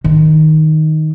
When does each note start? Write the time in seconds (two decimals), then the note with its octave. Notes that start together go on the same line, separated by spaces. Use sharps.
0.04 D#3